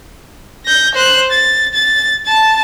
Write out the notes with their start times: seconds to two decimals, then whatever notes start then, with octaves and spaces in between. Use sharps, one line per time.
0.66 G6 A#6
0.95 C5 F#6
1.31 A6
1.74 A6
2.27 A5 A6